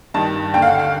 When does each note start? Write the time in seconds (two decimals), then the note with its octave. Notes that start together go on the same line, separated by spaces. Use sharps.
0.14 G2 D#3 A5
0.54 D#2 D3 G5
0.62 F5
0.67 F#5
0.79 F5